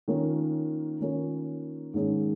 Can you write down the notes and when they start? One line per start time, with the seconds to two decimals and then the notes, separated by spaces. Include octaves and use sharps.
0.08 D#3 A#3 C#4 F4 A#4
1.00 D#3 A#3 C#4 F4 A#4
1.94 G#2 D#3 A#3 C#4 G#4